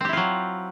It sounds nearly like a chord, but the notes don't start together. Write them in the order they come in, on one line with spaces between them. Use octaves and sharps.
C4 G4 E4 F4 F#3